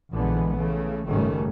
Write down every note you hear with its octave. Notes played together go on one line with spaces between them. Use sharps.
A#1 D3 E3 G#3 B3
C#3 E3 A3
F#1 G#2 D#3 G3 A3 C#4